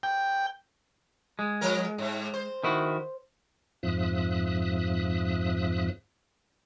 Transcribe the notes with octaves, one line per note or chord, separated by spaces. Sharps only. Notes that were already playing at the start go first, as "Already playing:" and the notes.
G5
G#3
F3 A#4
G#2
C5
D#3 E4 F#4
F2 G#2 F3 E5 D#6 F#6